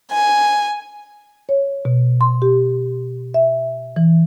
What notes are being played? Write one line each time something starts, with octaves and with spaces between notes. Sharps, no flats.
G#5
C#5
B2
C6
G4
E5
E3